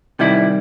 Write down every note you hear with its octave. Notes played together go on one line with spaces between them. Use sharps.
C3 D#3 G3 E4